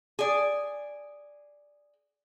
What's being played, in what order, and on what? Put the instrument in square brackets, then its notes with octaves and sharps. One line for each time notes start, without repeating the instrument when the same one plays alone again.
[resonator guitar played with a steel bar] G#4 D5